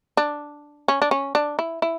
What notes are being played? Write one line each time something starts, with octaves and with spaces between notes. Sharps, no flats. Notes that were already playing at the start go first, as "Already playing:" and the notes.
D4
C#4
D4
C#4
D4
E4
E4